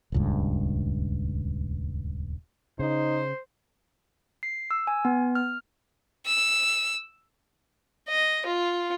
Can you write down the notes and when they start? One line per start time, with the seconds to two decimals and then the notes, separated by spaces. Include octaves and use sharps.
0.12 D#1 C#2 G2
2.79 C#3 D#4 C5
4.43 C7
4.71 E6
4.87 G#5
5.05 B3
5.35 F6
6.26 E6
8.09 D#5
8.47 F4